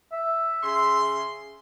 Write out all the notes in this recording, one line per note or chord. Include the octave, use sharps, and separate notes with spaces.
E5
C#3 G#4 C6